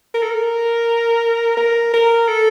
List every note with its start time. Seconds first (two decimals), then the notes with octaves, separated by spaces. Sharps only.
0.14 A#4
0.22 A4
0.30 A#4
1.57 A#4
1.94 A#4
2.29 A4